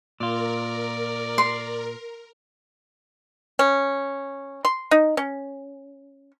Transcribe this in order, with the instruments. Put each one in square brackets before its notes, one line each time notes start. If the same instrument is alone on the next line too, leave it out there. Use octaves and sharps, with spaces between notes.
[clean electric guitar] A#2 F4 [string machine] A#4 [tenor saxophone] D5
[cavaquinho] C6
[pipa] C#4
C6
D#4
C#4